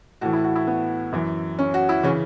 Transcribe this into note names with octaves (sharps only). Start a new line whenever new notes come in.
A2 E3 F#4
E4
F#4
E4
B3
F#2 E3
C#4
F#4
E4
C#3 E3 C#4